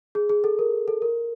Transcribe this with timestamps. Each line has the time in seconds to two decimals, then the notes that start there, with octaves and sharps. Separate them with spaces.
0.15 G#4
0.29 G#4
0.44 A4
0.59 A#4
0.88 A4
1.02 A#4